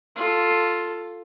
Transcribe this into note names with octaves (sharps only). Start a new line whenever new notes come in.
F4 A4